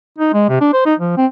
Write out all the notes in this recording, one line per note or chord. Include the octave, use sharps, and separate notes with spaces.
D#4
G#3
C3
D4
C5
D#4
F3
C4